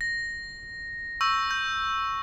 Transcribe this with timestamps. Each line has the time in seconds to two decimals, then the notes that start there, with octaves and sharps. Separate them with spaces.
0.01 A#6
1.21 C#6 E6 G6
1.51 G6